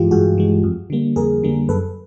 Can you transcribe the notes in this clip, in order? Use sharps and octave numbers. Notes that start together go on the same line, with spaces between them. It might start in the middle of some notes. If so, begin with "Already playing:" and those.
Already playing: G2 E3 G#3 F4 G4
G2 F#4 G#4
E3 G#3
F2
D3 G3 A#3
F2 G#4 A#4
D3 G3 A#3
F#2 A4 B4